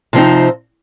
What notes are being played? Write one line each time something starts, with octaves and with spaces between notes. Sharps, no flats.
C3 F3 C4 D#4